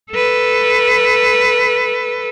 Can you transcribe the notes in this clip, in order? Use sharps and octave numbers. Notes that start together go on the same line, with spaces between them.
A4 B4